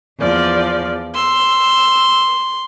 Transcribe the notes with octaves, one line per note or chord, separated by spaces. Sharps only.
E2 F3 D5
C6 E6